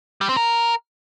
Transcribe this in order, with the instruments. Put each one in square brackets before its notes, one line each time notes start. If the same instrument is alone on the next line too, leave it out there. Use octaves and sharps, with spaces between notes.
[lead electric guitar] G3
C4
A#4